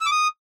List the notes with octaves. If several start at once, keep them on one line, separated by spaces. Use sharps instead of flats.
E6
D6
D#6